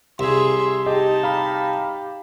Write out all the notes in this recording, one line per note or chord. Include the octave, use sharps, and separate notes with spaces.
C2 G#4 E5 C6
D#4 G4 G#4 D#5 A5
G4 F5 A#5 B5